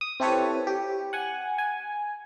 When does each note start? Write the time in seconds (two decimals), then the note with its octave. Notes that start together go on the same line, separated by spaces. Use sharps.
0.01 D#6
0.20 C4 E4 G4 A4 B4 C#5
0.67 G4
1.13 F#5 G#5
1.58 G#5